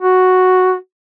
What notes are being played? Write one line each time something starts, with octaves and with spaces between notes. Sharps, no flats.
F#4